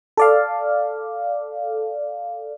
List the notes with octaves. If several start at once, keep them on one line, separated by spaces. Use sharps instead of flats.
A4 D5 F5